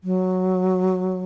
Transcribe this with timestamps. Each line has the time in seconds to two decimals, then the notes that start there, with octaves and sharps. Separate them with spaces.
0.04 F#3